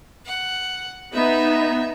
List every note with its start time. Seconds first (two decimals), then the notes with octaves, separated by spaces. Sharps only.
0.26 F#5
1.14 B3 D#4 E5